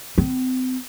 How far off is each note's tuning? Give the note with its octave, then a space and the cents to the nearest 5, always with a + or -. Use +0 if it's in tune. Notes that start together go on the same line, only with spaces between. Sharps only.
C4 -35